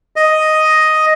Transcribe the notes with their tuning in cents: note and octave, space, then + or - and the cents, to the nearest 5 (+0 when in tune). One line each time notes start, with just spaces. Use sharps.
D#5 +5